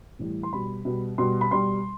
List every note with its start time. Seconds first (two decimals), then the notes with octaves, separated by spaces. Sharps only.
0.19 A2 E3 G3
0.43 C6
0.53 B2 G3 B5
0.85 B2 G3
1.18 B2 G3 C6
1.41 B5
1.51 B2 G3 C6